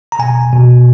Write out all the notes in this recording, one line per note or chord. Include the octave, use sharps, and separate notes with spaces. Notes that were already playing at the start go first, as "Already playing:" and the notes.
A#5
B2 G#5
B2